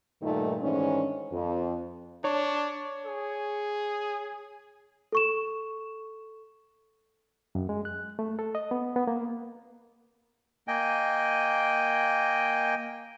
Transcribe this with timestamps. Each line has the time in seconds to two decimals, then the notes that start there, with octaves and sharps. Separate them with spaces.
0.21 G2 A#2 D#3 A3 D#4
0.62 G#2 D#3 E3 C#4 D4
1.32 F2
2.24 D4 C#5 C#6
3.06 G#4
5.12 A4 C#6 E7
7.55 F#2
7.69 G#3
7.85 F#6
8.19 A3
8.39 A4
8.55 D#5
8.71 B3
8.96 B3
9.07 A#3
10.68 A#3 D#5 G5 G#5